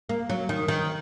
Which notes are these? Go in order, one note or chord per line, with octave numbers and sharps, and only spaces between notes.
A#3
F#3
D#3
D#3